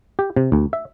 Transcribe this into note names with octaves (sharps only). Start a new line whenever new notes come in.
G4
C3
D2
E5